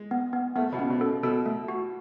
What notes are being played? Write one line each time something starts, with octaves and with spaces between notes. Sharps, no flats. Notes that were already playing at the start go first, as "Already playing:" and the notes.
Already playing: G#3
B3
B3
A3 B3
B2
C#3 B3
B2
C#3 A4
B2 A4
A3
F#4